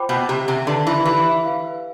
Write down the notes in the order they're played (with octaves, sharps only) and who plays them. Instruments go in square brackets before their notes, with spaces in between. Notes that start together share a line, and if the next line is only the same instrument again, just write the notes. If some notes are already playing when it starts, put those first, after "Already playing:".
Already playing: [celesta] F4 C5 G5 B5 D6
[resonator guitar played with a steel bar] B2
[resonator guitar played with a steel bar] C3 [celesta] G4
[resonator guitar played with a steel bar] C3
[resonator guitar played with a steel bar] D3 [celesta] B4 D5 A5 C6
[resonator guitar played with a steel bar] E3
[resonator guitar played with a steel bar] E3 [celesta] G4
[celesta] B4 F5